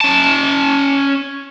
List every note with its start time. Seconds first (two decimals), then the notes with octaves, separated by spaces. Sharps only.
0.01 C#4 A5